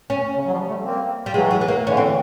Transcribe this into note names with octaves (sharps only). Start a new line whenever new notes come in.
C#4
C#3
F#3
F3 G3
G3 A3
A#3 C4
G3
E3 F#3 G#3
G#3
B3
A#3
D3 E3 C#4
C4